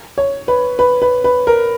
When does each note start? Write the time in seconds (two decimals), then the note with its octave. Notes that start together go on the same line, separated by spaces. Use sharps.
0.18 C#5
0.48 B4
0.79 B4
1.02 B4
1.24 B4
1.47 A#4